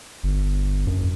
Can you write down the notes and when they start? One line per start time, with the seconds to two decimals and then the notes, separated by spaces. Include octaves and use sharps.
0.24 G1
0.87 F#2